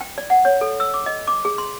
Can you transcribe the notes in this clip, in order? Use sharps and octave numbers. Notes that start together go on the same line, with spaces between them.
G5
D5
F#5
C#5
A4
E6
D6
D#5
D6
G#4
C6